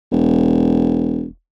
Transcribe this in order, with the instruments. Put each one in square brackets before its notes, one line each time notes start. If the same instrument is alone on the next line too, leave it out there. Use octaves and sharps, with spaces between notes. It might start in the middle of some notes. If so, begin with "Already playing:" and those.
[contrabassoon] E1